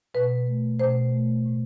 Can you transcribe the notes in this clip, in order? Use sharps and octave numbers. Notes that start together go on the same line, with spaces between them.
B2 B4
A3
B2 C5
A3
A2